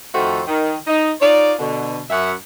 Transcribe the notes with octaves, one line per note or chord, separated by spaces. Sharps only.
F2 D#3 A3 F#4 A4 C5
D#3
D#4 D#5
D#4 F4 C#5 D5
B2 D3
F#2 E5 F#5